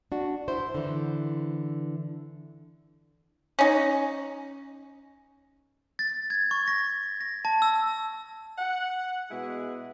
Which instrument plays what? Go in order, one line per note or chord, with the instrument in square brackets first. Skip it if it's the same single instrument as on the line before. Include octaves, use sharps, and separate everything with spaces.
[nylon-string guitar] D4 F#4
E4 C5
D3 E3
[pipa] C#4 D#4
[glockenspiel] A6
G#6
C#6
A#6
A#6
A5
E6
[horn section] F#5
B2 G#3 E4 G#4